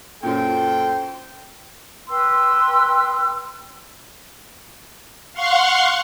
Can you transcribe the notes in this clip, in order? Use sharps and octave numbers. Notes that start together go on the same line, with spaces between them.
F#2 A#2 A4 C5 G5
B4 G5 C6 E6
F5 F#5 C6 C#6